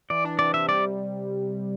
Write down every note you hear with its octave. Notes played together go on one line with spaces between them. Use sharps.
E3 D5
D4
C3 D5
C3 E5
G3 D5